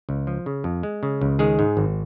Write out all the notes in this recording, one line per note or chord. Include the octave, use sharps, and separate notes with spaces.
C#2
F3
C#3
F2
G#3
C#3
C#2
D#3 G#3 G#4
G#2
G#1